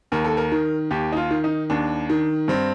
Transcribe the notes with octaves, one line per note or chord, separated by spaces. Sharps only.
D#2 A#4
A4
A#4
D#3
D#2 G4
D#4
F4
D#3
D#4
D#2 D4
D#3
G2 C4